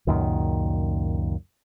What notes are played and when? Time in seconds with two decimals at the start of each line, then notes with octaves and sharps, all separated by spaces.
0.07 C#2 F#2 A#2 D#3